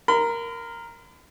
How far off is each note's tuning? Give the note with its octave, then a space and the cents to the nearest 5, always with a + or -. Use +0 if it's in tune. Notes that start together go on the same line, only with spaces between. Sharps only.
A#4 +0 B5 +45